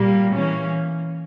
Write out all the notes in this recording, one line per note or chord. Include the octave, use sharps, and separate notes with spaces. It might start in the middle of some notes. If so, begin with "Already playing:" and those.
Already playing: A#2 G3 A#3
E3 A#3 C#4